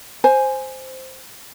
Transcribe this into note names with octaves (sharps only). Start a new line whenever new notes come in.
C5 G#5